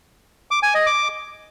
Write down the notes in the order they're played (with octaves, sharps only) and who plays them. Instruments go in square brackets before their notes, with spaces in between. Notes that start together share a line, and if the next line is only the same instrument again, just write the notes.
[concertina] D6
G#5
D#5
D6